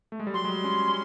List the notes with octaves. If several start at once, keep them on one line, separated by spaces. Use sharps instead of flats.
A3
G#3
G3
F#3 C6
G#3
G3
C#4
C#4